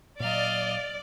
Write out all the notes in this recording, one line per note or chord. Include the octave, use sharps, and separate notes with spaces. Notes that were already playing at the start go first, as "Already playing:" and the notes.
A#2 F#3 D5 D#5 F5